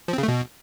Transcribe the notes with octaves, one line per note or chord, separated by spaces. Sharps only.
F3
C4
C#3
A3
B2